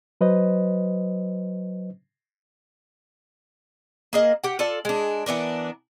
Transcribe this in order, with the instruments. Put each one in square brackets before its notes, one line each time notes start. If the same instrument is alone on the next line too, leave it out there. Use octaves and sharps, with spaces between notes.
[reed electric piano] F#3 B4 C5 D#5
[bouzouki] A#3 G#4 D#5
G4 F#5
F4 A4 D5 A5
G#3 D4
E3 B3 D4 A#4